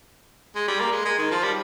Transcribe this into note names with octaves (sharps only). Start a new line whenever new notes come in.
G#3
G3
A#3
G#3
G#3
D#3
F3
G3